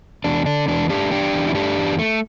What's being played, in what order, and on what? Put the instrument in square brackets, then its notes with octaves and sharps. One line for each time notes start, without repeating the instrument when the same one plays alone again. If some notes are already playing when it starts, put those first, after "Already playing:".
[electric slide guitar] E2 D4
D3 D4
E2 D4
A3 D4 G4
E2 D4 G4
E2
E4
A3 D4 G4
E2
A3